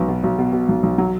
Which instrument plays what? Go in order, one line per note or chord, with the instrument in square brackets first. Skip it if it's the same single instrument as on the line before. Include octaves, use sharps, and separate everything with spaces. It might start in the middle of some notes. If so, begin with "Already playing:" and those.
Already playing: [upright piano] B1 B3
B2
B1
B2
B2
B1
B1
F#3